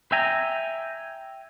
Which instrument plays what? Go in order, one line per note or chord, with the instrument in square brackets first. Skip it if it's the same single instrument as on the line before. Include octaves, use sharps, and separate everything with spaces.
[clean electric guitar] E5 G5 G#5 A#5